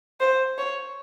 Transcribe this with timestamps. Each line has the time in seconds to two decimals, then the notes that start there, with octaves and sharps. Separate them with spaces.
0.20 C5
0.58 C#5